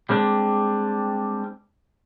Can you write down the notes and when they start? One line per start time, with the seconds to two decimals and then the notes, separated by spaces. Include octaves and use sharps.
0.09 G3 G#3 C4 D4